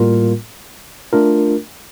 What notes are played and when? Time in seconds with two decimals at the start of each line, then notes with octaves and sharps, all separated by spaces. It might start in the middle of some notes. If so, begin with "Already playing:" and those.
Already playing: A2 G3 A#3 F4 A#4
1.13 A3 D4 F4 A#4